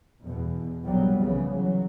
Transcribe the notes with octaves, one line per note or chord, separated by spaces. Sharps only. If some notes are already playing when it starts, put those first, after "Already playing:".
E2 B2
A#1 C3 F#3 G3 B3
C2 C#3 E3 F3
F#3